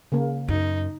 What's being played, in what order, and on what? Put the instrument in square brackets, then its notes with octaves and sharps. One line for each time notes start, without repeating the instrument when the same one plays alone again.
[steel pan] C#3 A#3
[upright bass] F#2 [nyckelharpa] D#4